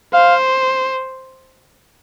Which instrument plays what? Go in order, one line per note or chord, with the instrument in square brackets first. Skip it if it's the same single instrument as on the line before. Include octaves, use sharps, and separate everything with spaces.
[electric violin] C5 [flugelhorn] F5